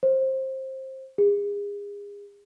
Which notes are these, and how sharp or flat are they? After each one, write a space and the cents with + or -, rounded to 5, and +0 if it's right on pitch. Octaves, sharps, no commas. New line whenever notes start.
C5 +20
G#4 -35